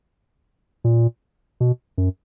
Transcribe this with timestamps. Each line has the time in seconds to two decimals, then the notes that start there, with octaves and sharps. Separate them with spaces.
0.84 A#2
1.60 B2
1.98 F#2